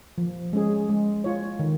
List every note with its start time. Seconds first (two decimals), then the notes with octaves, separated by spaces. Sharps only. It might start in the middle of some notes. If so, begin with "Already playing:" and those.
0.18 F3
0.53 G#3 C#4 G#4
0.89 G#3
1.24 F4 C#5
1.59 D#3